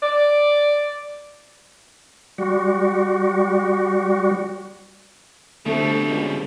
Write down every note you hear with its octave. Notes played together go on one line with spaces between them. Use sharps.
D5
G3 F#4
B2 D3 G3 A3 C4 A4
C#2